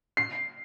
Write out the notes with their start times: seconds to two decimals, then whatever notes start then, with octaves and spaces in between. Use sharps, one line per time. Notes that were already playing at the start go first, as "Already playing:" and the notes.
0.17 C7